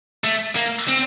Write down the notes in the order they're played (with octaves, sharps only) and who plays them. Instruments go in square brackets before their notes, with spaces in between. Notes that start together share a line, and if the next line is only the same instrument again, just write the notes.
[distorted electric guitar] A3
A#3
C4